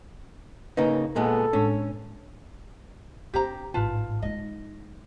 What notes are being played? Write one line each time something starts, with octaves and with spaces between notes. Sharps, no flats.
C#3 A#3 D#4 B4
A#2 G#3 B3 A4
A2 G#3 C#4 D4
C4 D4 G4 C5 A#5
A1 G#2 F4 B4 A5
G#3 D#4 D#5